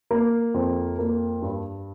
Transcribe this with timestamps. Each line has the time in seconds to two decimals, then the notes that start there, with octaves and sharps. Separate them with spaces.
0.11 A#3
0.54 F2
0.99 A#3
1.42 G2